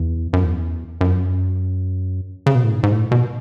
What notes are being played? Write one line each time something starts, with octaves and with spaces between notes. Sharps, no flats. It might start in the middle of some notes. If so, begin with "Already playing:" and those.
Already playing: E2
F#2
E2
F#2
C#3
B2
A2
G#2
G#2
A2
B2